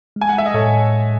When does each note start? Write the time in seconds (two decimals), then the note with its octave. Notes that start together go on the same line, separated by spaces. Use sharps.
0.16 G#3
0.21 G#5
0.29 F#5
0.38 E5
0.46 D#5
0.54 A2 A4 C#5